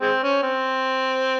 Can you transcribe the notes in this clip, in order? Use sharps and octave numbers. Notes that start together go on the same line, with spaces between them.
G#3 C4
C#4
C4